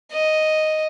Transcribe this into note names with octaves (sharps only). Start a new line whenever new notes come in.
D#5